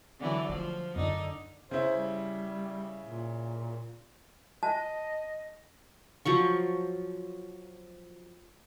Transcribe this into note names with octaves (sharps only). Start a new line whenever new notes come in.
D3 E3 F#3
F3 F#3 A3
F#2 D3 D#4
C#3 E4 C5
G3
A#2
D#5 A5
F3 F#3 C#6